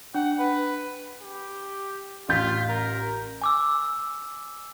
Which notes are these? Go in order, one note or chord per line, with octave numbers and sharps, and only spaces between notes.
D4 F#5
B4
G4
A1 F4 G6 B6
A#4
G#5 D6 E6